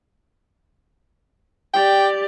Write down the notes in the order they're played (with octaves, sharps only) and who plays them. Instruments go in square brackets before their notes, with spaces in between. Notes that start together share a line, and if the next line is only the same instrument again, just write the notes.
[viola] G4 D5 [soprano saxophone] G5